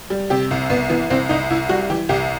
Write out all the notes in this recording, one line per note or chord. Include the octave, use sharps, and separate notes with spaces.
G3
C3 G4
C2
C2 B3
E3 B3
C2 C4
C2 D#4
C2 E4
G3 F#4
E3 G4
C2 G4